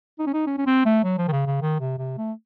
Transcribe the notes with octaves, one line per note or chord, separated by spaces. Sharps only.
D#4
C#4
D#4
C#4
C#4
C4
A3
F#3
F3
D#3
C#3
C#3
D#3
C3
C3
A3